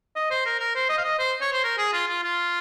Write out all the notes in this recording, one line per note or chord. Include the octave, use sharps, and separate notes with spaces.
D#5
C5
A#4
A#4
C5
D#5
F5
D#5
C5
C#5
C5
A#4
G#4
F4
F4
F4